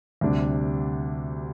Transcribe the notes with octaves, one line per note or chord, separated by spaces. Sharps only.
D2 C3 G3 D4